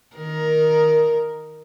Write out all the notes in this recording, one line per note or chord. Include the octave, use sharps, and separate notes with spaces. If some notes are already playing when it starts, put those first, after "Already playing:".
D#3 A#4